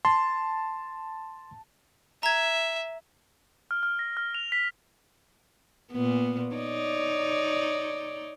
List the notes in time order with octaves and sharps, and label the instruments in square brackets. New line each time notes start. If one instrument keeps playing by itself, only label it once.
[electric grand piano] A5 [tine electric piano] C6
[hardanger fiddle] E5 [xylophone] A#5 G#6
[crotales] F6
F6
A#6
F6
F7
B6
[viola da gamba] A#2 B3
D#4 C#5 D5